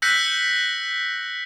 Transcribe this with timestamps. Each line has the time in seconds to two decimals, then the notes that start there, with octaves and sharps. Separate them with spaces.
0.02 E6 F#6 G6 A#6 B6 C#7